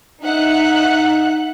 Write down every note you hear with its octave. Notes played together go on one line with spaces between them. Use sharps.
D#4 E5 F#5 F#6